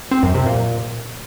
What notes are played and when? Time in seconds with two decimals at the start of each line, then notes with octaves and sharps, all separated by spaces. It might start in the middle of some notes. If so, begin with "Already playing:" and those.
0.11 C4
0.23 F#2
0.34 C3
0.46 A#2